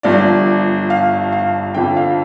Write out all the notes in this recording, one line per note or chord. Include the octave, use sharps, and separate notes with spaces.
G1 G2 F3 D5
F5
F5
F2 D3 F3 G5
F5